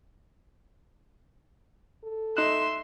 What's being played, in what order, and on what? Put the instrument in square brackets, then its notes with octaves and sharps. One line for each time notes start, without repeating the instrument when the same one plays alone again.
[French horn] A4
[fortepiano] D#4 F#6 [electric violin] E5 C6 [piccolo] E7